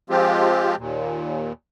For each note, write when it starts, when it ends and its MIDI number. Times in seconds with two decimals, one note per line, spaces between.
0.10 0.76 53
0.10 0.76 56
0.10 0.76 60
0.10 0.76 65
0.10 0.76 67
0.78 1.53 39
0.78 1.53 46